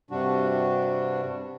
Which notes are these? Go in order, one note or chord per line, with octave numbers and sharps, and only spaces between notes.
G2 C3 G3 D4 F#4